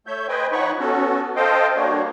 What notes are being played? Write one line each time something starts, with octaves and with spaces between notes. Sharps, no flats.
A3 C#5 E5 G6
B4 C5 D#5 G5 G#5
F3 D#4 C#5 F#5 B5 C#6
B3 C#4 F#4 A4
A4 C5 D#5 F5 G5
G3 A#3 D4 F#4 C#5